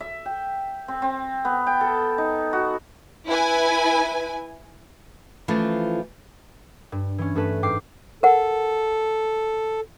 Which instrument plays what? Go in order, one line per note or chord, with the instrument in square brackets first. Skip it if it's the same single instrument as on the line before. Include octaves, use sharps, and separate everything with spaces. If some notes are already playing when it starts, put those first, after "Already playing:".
[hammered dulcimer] E5
G5
C4
C4
B3
G5
A4
D#4
F#4
[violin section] E4 B4 G#5
[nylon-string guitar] E3 F3 A3 C#4 F4
[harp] G2
E3 C#4
G2 A3 A4 B4 B6
G#2 G5 D6 C7
[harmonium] A4 [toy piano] A#4 F#5